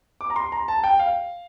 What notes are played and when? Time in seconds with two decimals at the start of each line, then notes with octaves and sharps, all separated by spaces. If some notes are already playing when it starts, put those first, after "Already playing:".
0.21 D6
0.30 A#5
0.36 C6
0.52 A#5
0.68 A5
0.84 G5
0.99 F5